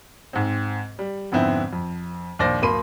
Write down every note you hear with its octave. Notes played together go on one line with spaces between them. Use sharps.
G#2 C4
G3
F2 G#2 D3 B3 C4 E4
F2
A#1 D#2 C5 D5 A#6
D1 A#3 B5 C6 D#7